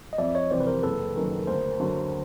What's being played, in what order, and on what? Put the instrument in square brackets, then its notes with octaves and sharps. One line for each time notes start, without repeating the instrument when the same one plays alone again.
[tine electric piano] D#5
[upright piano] F2 [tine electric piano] D5 E5
[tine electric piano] C#5 D#5
[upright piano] C3 E3 G3 [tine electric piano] C5 D5
[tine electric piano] B4
A#4 C5
[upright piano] F#1 [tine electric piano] A4 B4
[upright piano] F#2 D#3
[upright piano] D2 [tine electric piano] A#4 C5
[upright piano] D3 F#3